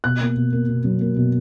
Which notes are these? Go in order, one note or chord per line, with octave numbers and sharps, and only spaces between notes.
B2 F#6
A#3
B2
A#3
B2
F#3
A#3
B2